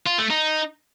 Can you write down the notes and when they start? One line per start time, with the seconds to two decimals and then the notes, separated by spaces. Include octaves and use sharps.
0.06 F4
0.18 A3
0.30 D#4